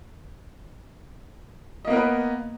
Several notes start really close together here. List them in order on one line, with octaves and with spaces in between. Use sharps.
D#5 A#3 B3 A#4 B4